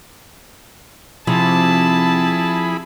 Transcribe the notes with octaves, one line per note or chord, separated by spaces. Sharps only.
C3 F3 E4 G#4 A5 B5